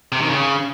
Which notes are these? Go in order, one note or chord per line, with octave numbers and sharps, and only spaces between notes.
C3
D#3
C#3